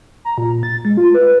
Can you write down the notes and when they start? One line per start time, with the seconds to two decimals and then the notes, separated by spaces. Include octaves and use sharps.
0.25 A#5
0.38 A#2
0.63 A6
0.85 G#3
0.97 F4
1.14 B4